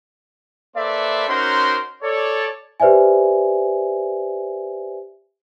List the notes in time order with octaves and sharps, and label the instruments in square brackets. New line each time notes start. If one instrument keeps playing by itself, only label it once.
[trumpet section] A#3 A4 B4 C5 D5 E5
C#4 D#4 F#4 A#4 C5 C6
A4 C#5 D5
[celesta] G4 B4 C5 D5 E5 G#5